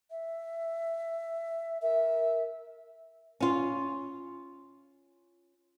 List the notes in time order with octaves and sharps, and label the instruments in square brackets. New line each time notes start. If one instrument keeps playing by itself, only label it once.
[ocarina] E5
[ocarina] A#4 [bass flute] E5
[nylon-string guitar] C#4 F4